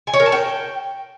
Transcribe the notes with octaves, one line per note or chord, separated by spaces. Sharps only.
G#5
C#5
A#4
A5
G5